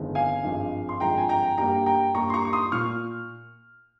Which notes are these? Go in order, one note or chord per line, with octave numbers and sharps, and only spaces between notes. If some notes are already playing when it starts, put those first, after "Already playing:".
Already playing: G1 F2 D#3 G#3
F5 G#5
G#1 G2 F3 G#3
C6
G#1 G2 F3 G#3 G5 A#5
G#5
G5 A#5
G2 G3 A#3 G5 A#5
G5 A#5
G2 G3 A#3 A#5 C#6
C6
A#5 C#6
C#6
C6 D#6
A#2 C#6 F6